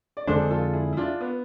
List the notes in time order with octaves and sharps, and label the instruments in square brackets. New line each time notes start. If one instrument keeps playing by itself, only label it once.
[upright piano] D5
[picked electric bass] F2 D3 G#3 D4 [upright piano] A4 C5
[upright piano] G#4
F4 A4
E4 G#4
E4
D4 F4
B3